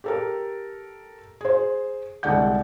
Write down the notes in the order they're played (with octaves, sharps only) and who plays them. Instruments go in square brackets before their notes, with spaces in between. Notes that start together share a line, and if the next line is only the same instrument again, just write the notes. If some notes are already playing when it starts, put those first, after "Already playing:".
[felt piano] G4 A4 A#4
G#4 C5
C2 D3 G#3 D5 F#5 G6